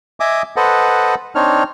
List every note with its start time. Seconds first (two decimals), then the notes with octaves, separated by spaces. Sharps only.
0.20 D#5 E5 G#5 D6 D#6
0.56 A4 B4 C5 D#5 F#5
1.35 C4 D4 D#4 C#5 F6